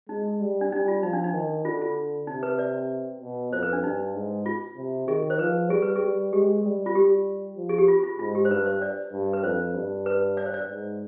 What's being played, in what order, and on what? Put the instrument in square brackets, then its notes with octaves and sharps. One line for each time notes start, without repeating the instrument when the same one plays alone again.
[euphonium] G#3 [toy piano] D#4
[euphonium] G3
[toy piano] D4
[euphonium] G3 [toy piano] D#4
[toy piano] F4
[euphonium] F3 [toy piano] D#4
[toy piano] D4
D#4
[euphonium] D#3
[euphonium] D3 [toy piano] F4
[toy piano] F4
[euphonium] C3 [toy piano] D#4
[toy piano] B4
D5
[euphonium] B2
[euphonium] F2 [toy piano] C5
[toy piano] B4
D4
[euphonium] G2 [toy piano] D#4
[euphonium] G#2
[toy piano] F4
[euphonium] C3
[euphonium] D#3 [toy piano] G#4
[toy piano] C5
[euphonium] F3 [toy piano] B4
[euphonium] G3 [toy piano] G#4
[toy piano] B4
G#4
[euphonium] G3
[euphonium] G#3 [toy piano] G4
[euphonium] G3
[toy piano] F4
[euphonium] G3 [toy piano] G4
[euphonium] F3
[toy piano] G#4
G4
F4
F4
[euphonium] G#2 [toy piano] F4
[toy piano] G4
C5
[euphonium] G2 [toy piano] B4
[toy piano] C5
D5
[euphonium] G2
[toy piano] B4
[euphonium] F2 [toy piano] C5
[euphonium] G2
[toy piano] B4
D5
C5
D5
[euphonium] G#2